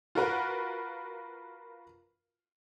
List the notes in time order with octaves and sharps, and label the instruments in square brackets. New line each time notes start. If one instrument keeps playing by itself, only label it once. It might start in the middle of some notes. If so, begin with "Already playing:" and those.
[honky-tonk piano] F4 F#4 A#4 B4